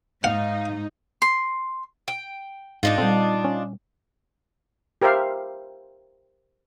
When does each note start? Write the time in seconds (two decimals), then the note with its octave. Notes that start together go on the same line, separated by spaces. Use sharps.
0.24 G#2 D#4 F5 F#5
1.22 C6
2.08 G5
2.83 G#2 D4 D#4 F4
2.98 A#2 G3 C4 A4
3.45 C#4
5.02 G4 A#4 C5 E5 F5